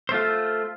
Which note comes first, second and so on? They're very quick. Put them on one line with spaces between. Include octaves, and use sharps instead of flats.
C5 A3 F4